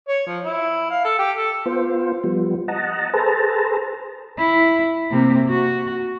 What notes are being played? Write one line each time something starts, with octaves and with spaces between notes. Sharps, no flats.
C#5
F3
E4
F5
A4
G4
A4
B3 F4 C5
F3 G3 B3
D#5 F#5 A5 A#5
G#4 A4 B4 C5 A5 A#5
E4
C3 A#3
F#4